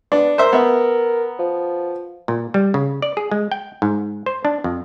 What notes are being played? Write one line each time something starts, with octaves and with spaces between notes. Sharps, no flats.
B3 D4
A#4 C5 E5
B3 E5
F3
A#2
G3
C#3
D5
G#4
G#3
G5
G#2
C5
D4
F2